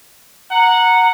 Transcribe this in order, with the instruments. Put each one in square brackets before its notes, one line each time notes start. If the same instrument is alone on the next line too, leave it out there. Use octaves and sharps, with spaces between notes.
[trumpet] F#5 [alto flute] A#5